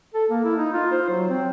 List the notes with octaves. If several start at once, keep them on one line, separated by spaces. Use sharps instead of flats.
A4
A#3
E4
D#4
F4
C5
F#3
C4